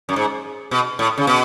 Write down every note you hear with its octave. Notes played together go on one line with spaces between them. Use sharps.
F#2
G#2
B2
A2
C#3
B2